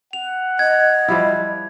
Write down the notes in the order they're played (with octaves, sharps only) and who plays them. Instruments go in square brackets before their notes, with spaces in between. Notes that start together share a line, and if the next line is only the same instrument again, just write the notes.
[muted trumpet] F#5 [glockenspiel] F7
[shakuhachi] D#5 [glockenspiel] G#6
[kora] F3 G3 E4